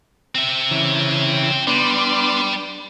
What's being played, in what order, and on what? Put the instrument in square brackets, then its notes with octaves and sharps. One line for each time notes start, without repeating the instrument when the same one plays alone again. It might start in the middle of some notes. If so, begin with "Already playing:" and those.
[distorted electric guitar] C4 E5
[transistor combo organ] C#3 E3
[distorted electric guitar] G3 [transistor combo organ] B3 D4 C6